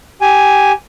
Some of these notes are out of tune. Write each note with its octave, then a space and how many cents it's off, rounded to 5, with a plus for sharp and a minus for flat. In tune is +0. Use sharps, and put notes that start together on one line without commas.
G4 -5 G#5 +0